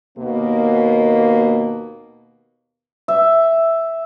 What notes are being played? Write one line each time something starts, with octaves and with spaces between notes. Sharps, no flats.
D#2 B2 A#3
E5